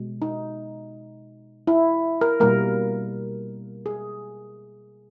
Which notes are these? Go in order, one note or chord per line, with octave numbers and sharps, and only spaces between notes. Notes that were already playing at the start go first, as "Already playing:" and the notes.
Already playing: B2 G#3
D#4
E4
A#4
B2 G3 A#3 A#4
G#4